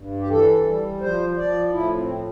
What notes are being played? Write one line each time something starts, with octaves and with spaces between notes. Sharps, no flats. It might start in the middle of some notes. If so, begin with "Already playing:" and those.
Already playing: G2
G4
E3 A4
G3
F3 C5
F3 D5
A2 E4
C4
F3